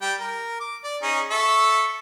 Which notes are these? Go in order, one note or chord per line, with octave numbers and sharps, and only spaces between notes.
G3 G5
A#4
D6
D5
C#4 D#4 G#4
A4 E5 C#6